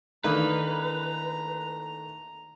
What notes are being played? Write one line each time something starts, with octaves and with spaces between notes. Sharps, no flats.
D#3 E3 A3 A#3 D4 D#4 B4 A#5